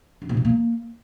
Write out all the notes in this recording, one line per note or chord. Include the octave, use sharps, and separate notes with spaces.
F#2
A#2
B2
A#3